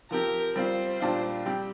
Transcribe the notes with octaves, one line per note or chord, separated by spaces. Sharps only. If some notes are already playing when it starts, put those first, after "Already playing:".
F3 C4 G4 A#4
G3 C4 F4 C5
A#2 G3 D4 F4
G3 C4 G4